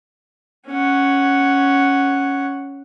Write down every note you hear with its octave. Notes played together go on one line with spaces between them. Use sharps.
C#4 F#5